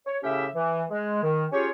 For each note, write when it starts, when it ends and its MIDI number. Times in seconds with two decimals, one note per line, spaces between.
0.07 0.17 73
0.23 0.47 45
0.23 0.47 49
0.23 0.47 61
0.23 0.47 67
0.23 0.47 76
0.55 0.83 52
0.90 1.19 56
1.23 1.46 51
1.52 1.69 61
1.52 1.69 65
1.52 1.69 67
1.52 1.69 68
1.52 1.69 73